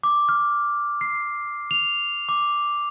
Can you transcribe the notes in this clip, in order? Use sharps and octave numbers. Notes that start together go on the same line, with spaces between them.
D6
F6
C7
F7
D6